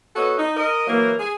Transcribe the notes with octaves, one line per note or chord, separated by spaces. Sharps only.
B3 F#4 A4 C#5 D#5
D#4
A#4 D#5
E3 F#3 A#3
G#4